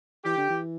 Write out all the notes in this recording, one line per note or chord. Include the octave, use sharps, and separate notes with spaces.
E3 G4
D3
E3